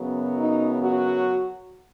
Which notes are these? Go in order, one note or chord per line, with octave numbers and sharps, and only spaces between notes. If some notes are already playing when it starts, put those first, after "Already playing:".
Already playing: F#2 C#3 F#3 B3
D#4
F#3 F#4